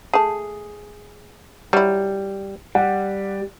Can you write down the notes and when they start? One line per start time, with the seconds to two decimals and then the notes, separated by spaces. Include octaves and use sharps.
0.14 A3 G#4 A5
1.73 F#3 G3 E4
2.75 G3 F#5